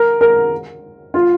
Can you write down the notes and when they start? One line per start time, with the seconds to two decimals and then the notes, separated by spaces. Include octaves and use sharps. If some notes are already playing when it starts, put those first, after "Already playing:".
Already playing: A#4
0.21 A#4
1.14 F4